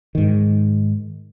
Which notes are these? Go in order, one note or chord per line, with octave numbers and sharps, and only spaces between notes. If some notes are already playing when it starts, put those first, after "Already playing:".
G#2 D#3